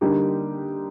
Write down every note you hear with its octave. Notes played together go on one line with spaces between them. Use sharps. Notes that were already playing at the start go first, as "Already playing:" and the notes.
D3 G3 A#3 D#4 G4